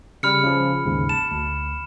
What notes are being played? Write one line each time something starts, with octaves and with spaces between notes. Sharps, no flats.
C#3 G3 B5 F6 C#7
C#3 F3
D#2 G#2 C#3
A5 E7
D2